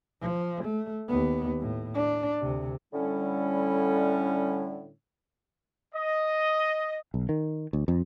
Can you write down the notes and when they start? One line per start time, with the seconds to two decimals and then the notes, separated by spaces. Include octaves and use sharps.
0.21 F3
0.64 A3
1.08 D#2 B3
1.60 A2
1.95 D4
2.40 D2 C3
2.93 A2 D3 G3 C#4
5.94 D#5
7.14 B1
7.29 D#3
7.73 D2
7.88 F2